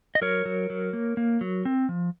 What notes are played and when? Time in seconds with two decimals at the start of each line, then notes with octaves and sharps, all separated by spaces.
0.15 D#5
0.21 F#3 A#4 C#5
0.45 F#3
0.70 F#3
0.93 A#3
1.17 A#3
1.41 F#3
1.65 C4
1.89 F3